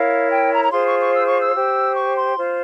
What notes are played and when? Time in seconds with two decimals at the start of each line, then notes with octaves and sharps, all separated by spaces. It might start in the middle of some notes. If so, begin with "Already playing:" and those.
Already playing: E4 A#4 C#5 F5
0.30 G5
0.50 A#5
0.63 A#5
0.71 F4 G#4 C5 C6
0.85 C#6
0.99 C#6
1.12 E6
1.26 C#6
1.40 E6
1.54 G4 C5
1.95 C#6
2.16 C6
2.37 F4 C5